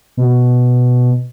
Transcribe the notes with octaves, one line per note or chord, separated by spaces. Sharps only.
B2